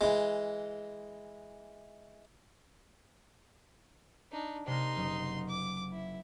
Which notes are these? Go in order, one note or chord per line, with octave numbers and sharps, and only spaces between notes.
E3 G#3
D4 D#4
C3 A#3 D#4 C6
F#1 F#3 D#6
D6
E4